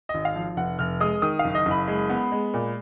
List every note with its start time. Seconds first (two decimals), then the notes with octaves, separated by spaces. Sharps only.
0.09 G#1 D#5
0.25 F5
0.35 F3
0.57 F1 F#5
0.79 F1 F6
1.00 G#3 D#6
1.22 D#3 D#6
1.39 F5
1.45 F#1
1.55 D#5
1.66 F#1 B5
1.88 G#3
2.10 B3
2.32 G#3
2.54 A#2